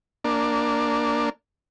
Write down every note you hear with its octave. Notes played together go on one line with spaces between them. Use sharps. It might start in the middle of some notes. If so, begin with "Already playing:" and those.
A#3 D4